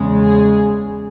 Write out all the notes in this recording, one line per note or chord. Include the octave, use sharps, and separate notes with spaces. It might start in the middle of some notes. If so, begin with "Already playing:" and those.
Already playing: E2 C#3 G#3
G#4